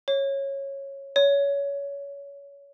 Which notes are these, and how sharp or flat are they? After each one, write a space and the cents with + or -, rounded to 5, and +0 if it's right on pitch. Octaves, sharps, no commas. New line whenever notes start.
C#5 -10
C#5 +25